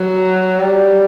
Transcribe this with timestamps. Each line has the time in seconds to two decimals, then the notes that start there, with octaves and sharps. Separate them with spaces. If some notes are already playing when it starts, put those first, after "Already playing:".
Already playing: F#3
0.60 G3